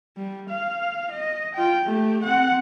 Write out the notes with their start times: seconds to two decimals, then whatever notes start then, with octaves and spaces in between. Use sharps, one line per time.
0.17 G3
0.50 F5
1.12 D#5
1.55 F4 G5
1.85 A3 G4
2.23 C4 F#5